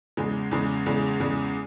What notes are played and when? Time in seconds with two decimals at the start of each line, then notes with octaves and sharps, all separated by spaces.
0.17 E2 C#3 G#3
0.51 E2 C#3 G#3
0.86 E2 C#3 G#3
1.20 E2 C#3 G#3